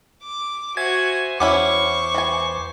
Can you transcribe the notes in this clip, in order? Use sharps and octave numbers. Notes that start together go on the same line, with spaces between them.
D6
F#4 C5 E5 G#5 G#6
E2 B3 C#4 E4 C5 C#6 D6
E3 G#5